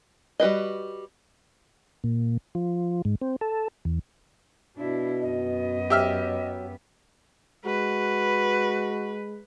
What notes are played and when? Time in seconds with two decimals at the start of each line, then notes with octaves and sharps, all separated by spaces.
0.40 G3 F#4 B4 D#5
2.04 A#2
2.55 F3
3.05 G#2
3.21 C4
3.41 A4
3.85 E2
4.77 B2 D4 E4
5.21 F#2 B3 D#5
5.90 F#3 G4 E5 F6
7.65 G#3 F#4 B4